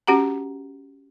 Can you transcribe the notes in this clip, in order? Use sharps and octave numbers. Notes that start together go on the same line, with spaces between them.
C#4 F#4 G4 F#5 A#5